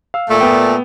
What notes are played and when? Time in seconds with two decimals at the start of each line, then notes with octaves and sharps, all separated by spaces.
0.14 F5 E6
0.29 A#2 A3
0.41 B3 G5